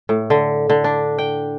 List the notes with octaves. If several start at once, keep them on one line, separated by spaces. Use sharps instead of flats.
A2
D3
D3
D4
G5